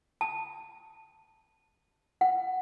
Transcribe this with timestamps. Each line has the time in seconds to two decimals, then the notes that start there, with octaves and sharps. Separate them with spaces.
0.21 A5
2.21 F#5